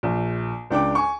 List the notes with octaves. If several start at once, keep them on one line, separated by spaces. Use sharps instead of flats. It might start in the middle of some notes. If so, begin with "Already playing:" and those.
A#1
C#2 D4 G5 D6
G#5 C#6